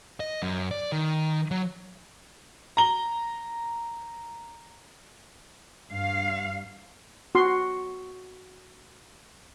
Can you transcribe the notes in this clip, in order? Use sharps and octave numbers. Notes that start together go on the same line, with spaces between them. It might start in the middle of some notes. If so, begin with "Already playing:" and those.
D#5
F#2
D5
D#3
F#3
A#5 G7
G2 F5
F#4 C6